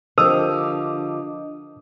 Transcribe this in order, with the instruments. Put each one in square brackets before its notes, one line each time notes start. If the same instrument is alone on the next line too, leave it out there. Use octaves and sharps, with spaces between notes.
[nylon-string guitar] D3 F3 G4 [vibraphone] D4 D#5 D6 [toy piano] A#4 [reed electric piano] D#6